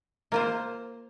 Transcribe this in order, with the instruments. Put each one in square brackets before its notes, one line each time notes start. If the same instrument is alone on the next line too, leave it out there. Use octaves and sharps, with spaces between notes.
[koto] A#3 F4 C5